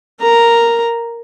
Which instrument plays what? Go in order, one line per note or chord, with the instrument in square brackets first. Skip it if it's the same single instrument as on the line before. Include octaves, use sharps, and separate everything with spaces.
[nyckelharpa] A#4 A#5